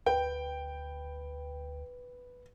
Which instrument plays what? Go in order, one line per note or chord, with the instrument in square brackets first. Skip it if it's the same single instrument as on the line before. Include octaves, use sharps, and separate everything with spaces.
[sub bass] D2 [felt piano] B4 [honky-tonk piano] G5